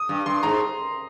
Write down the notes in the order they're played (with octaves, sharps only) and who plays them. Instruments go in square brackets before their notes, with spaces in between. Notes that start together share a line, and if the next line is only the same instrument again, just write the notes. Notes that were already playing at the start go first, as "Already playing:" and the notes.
Already playing: [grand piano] D#6
[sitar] G2
[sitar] G2 [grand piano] C6
[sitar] G#2 [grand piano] A#5